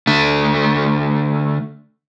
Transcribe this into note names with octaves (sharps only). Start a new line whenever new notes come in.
D3 A3